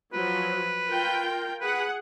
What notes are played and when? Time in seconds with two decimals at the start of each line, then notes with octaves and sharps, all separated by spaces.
0.13 F3 F#3 B4
0.88 F4 A#4 G5
1.61 G#4 B4 F#5